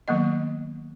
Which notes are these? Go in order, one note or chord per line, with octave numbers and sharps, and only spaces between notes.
D#3 F#3 A#3 B3 D#5